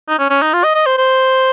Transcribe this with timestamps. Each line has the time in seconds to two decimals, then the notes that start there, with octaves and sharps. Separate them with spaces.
0.08 D#4
0.19 C#4
0.30 C#4
0.42 D#4
0.53 F4
0.64 D#5
0.75 D#5
0.86 C5
0.98 C5